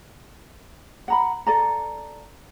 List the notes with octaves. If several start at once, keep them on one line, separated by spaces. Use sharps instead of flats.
F#5 A#5 B5
A4 D5 A#5